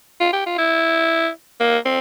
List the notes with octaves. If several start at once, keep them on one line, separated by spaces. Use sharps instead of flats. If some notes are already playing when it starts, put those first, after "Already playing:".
F4
G4
F4
E4
A#3
C4